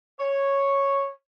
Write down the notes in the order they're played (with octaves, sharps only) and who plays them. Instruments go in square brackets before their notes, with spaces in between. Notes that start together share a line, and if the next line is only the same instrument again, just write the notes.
[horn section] C#5